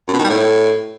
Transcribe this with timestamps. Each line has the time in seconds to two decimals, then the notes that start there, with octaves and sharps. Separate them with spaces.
0.08 F#2
0.14 B2
0.19 D#3
0.24 G3
0.30 A2